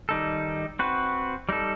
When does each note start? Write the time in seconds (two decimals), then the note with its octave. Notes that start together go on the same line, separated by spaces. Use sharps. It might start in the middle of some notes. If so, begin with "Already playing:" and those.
0.09 D#3 G3 D#4 A4
0.79 C4 F#4 B4
1.49 G3 D#4 A4